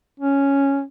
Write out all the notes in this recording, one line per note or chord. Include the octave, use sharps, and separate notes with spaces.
C#4